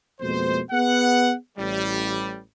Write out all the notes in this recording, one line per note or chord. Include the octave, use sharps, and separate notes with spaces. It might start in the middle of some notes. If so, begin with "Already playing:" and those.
F2 B2 G#3 A#3 C5
B3 G#4 F#5
A1 G3